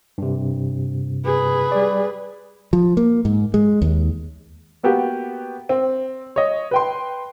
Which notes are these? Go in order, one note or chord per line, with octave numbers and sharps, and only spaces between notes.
G2 C3
G#4 B4
G3 D5
F3
A#3
G#2
G#3
D#2
A#3 B3 F#4 G4
C4
C#5 D#5
B4 G5 C6